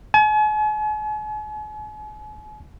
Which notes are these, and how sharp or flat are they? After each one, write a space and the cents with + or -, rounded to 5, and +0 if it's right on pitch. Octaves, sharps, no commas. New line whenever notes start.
G#5 +45